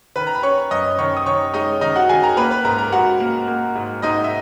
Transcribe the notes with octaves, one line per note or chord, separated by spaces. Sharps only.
D#3 B4 B5
A#5
B5
C#4 C#5 C#6
F#2 D#5 D#6
D#3 C#5 C#6
D#6
D#3 C#5 C#6
G#3 D#4 D#5
D#3 D#4 D#5
F#4 F#5
D#3 G#4 G#5
A#4 A#5
A#3 B4 B5
B4 B5
G#2 A#4 A#5
A#4 A#5
G#2 F#4 F#5
A#3
A#3
G#2
G#2 D#4 D#5
E5